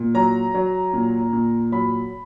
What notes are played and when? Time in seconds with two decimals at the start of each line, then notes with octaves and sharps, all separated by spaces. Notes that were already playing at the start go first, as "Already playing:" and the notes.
Already playing: A#2
0.14 F#3 A#5
0.54 F#3
0.93 A#2
1.33 A#2
1.72 F#3 B5